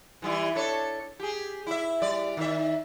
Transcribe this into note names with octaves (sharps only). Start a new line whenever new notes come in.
E3 G3 E4
D4 A4 C#5
G4 G#4
E4 E5
G3 D5
D#3 E5